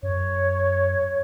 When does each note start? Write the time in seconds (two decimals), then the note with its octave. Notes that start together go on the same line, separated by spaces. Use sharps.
0.03 F#2 C#5